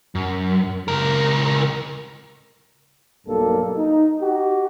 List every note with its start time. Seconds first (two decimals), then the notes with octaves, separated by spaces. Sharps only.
0.15 F#2
0.88 C#2 A#4
3.27 B1 G2 A#3 A4
3.77 D#4
4.22 D#4 F#4 G4